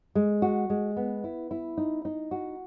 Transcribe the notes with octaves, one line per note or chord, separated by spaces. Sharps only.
G#3
F#4
G#3
B3
E4
E4
D#4
D#4
F#4